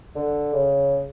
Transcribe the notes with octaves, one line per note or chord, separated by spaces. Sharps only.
D3
C#3